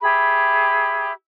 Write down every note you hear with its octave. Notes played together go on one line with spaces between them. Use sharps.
G4 G#4 E5 B5